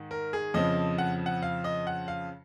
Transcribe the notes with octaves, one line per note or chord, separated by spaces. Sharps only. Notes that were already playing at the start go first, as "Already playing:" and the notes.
Already playing: G#2 D#3
A#4
G#4
F2 C#3 F3 D#5
F#5
F#5
F5
D#5
F#5
F5